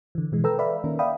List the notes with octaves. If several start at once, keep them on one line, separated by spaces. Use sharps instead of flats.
D3 E3
B2 E3 G#3
A4 B4 G5 A#5 E6
B4 D5 E5 F5 B5
D#3 A#3 C#4 A#4
D5 E5 F5 G5 B5 D#6